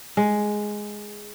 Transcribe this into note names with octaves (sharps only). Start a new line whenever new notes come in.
G#3